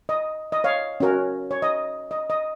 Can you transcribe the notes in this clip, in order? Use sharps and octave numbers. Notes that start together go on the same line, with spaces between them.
D#5
D#5
C#5 F5
C#4 F#4 A#4
C#5
D#5
D#5
D#5